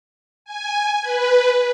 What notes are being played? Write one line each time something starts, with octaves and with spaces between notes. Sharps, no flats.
G#5
B4